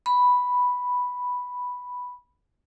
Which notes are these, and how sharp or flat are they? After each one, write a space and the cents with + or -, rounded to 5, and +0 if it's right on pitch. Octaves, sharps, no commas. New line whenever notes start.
B5 +0